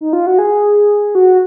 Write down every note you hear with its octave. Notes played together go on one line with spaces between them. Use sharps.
D#4
F4
F#4
G#4
F#4